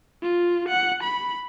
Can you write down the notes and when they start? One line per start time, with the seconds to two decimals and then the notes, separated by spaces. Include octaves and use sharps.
0.23 F4
0.69 F#5
1.04 B5